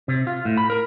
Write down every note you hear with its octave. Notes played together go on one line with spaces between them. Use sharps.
C3
F4
A2
B5
A#4